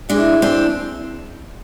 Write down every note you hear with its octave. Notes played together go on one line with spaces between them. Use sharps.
A2 E3 G#3 D4 E4
C4 D4